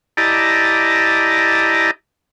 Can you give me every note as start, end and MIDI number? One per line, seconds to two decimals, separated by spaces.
0.17 1.91 64
0.17 1.91 67
0.17 1.91 74
0.17 1.91 75
0.17 1.91 81
0.17 1.91 82